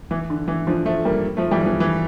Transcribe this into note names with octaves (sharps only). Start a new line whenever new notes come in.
E3
D3
E3
D3 F3
F3 A3
G3 A#3
F3 A3
E3 G3
F3
E3
E3